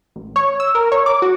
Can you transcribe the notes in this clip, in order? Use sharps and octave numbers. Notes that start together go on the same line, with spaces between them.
A1
C#5
E6
A#4
C#5
D6
F#4